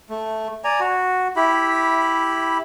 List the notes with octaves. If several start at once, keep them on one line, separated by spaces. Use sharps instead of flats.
A3
D5 G#5 A#5
F#4
E4 G4 B5